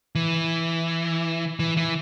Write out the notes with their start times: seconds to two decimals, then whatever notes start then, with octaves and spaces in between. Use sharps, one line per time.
0.15 E3
1.59 E3
1.77 E3